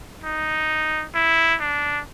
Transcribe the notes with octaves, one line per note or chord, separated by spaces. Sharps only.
D#4
E4
D4